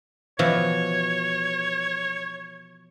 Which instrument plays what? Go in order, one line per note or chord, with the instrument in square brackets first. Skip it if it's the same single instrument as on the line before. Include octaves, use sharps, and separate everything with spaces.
[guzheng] B2 E3 F3 [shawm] C#5